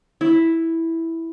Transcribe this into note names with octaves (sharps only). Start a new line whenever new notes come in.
E4